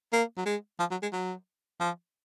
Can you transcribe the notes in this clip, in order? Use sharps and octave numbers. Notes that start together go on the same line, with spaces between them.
A#3
F#3
G#3
F3
F#3
G#3
F#3
F3